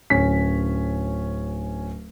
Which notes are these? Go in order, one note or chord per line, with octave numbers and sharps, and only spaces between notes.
D1 C#4 B6